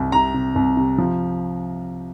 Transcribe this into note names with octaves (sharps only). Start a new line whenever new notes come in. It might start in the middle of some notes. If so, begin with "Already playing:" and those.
Already playing: C2
C3 A#5
C3
C2
C3
F3